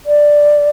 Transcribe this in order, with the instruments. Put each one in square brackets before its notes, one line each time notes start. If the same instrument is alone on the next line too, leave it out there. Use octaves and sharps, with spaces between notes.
[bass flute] D5